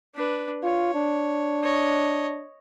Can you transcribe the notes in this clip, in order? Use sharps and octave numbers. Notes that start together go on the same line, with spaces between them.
D4 B4
F4 C#5
D4
C#5 D#5